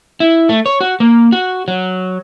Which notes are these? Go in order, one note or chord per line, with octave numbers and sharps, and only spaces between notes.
E4
A3
C#5
F#4
A#3
F#4
F#3